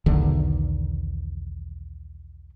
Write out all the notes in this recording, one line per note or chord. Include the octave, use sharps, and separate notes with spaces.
B1 E2 D3 D#3